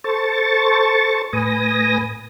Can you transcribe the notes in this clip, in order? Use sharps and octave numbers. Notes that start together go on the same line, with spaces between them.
A4 C5 C#6 A6
A2 B4 G#5 D#6 A#6